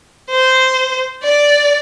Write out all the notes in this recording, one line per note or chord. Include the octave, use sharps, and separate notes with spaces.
C5
D5